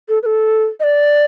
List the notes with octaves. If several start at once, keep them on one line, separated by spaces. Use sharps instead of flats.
A4
B4
A4
D#5
D5